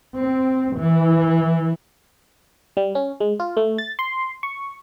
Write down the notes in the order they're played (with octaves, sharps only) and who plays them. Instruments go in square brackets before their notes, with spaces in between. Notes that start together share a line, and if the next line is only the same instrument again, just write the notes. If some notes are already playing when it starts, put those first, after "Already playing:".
[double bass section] C4
E3
[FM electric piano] G3
C#4
G#3
F4
A3
A6
C6
C#6